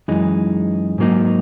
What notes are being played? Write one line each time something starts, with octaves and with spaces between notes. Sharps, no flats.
F#2 E3 G#3 D#4
G#2 F#3 A#3 D#4